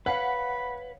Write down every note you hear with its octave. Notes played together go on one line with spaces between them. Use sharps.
B4 C#5 F5 F#5 B5